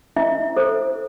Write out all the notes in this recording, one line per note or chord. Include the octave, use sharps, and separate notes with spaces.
E4 E5
A4 C5